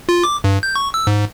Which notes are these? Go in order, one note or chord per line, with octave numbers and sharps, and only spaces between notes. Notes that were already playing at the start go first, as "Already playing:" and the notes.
F4
D6
G2
G6
C#6
E6
G#2